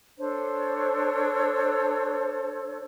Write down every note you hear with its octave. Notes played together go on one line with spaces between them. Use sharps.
D4 A4 C5 C#5